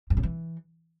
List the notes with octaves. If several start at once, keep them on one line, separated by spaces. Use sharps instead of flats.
G2
C#3
E3